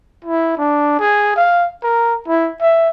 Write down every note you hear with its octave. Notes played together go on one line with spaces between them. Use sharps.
E4
D4
G#4
F5
A#4
E4
E5